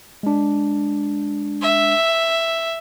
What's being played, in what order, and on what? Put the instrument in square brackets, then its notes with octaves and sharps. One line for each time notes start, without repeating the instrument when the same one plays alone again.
[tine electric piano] G#3 D4
[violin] E5